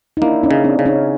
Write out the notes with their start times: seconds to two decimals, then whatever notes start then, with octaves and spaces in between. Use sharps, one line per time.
0.17 D#4
0.22 A#3 D4 E4
0.43 C#4 D#4
0.51 C#3
0.64 C4 D4
0.79 C#3
0.85 C#4 D#4